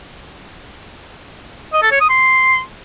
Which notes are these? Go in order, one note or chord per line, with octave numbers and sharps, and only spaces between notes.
D#5
A4
C#5
D#6
C6